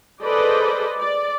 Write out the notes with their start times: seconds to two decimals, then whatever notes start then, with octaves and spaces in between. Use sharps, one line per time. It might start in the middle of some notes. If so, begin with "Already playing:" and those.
0.22 G#4 A4 B4 C5 D5 D#5
0.98 D5